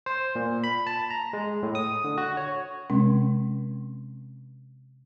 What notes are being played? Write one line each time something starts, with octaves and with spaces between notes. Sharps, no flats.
C5
A#2
B5
A5
A#5
G#3
A2
D#6
D3
F#4
C#5
C3 G#3 C4 C#4